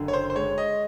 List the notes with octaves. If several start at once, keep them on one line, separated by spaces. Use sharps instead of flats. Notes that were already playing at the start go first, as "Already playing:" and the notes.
Already playing: F#1 D3
C#5
C5
C5
G#3 C#5
D#5